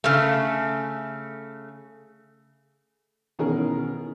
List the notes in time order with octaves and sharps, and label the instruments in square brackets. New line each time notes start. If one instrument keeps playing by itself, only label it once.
[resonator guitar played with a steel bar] C#3 A3
[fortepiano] B2 D#3 E3 C#4 G#4 A#4